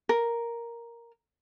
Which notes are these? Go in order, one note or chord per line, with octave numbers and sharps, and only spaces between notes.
A#4